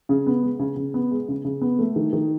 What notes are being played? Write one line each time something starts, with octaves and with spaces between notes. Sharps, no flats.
C#3
B3
G#3
C#3
C#3
B3
G#3
C#3
C#3
B3
A3
D#3
D#3